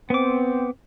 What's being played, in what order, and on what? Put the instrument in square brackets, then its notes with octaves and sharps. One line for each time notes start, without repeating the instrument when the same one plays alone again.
[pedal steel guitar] B3 D6 [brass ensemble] C4